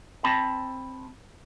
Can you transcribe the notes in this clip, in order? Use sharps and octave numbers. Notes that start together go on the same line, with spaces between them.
C4 A5 B5